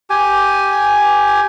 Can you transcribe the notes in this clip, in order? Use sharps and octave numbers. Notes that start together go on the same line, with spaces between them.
G4 G#5